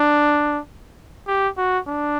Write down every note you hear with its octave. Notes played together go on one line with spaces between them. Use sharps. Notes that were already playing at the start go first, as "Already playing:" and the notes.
Already playing: D4
G4
F#4
D4